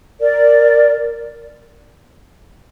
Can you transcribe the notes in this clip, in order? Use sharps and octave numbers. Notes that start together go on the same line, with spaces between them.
A#4 D5